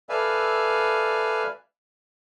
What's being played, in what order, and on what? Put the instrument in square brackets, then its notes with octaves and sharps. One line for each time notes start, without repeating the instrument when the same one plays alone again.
[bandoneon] A4 B4 D5 E5 F5 G#5